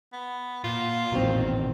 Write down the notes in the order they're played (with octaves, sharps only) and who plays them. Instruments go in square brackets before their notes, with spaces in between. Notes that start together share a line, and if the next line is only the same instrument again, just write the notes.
[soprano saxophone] B3
[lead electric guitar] A#2 [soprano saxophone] F4
[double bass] A1 E2 [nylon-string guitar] B2 D#3 C4